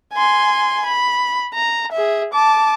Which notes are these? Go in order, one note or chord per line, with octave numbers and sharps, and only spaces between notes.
G#5 C6
B5
A#5
G#4 E5
A5 D6